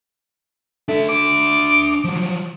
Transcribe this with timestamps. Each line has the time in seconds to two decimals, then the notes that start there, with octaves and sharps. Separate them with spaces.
0.88 A3 D4 E5
1.09 D6
2.04 F3 F#3